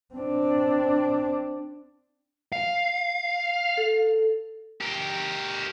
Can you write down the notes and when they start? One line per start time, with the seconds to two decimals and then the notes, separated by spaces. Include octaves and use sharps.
0.15 C4 D4
2.52 F5
3.77 A4
4.81 G4 A#4